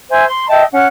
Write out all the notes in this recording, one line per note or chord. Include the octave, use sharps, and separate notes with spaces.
C5 E5 G#5
C6
D#5 E5 G5 A5
C#4 F#5